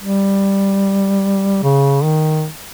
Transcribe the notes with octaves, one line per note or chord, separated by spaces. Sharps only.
G3
C#3
D#3